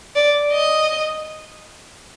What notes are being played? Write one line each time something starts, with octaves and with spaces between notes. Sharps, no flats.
D5
D#5